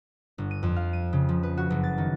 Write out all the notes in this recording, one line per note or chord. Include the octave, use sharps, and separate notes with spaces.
G1
D#7
F2
F5
D#7
C#3
F3
B4
F#4
F#1
A6
D#3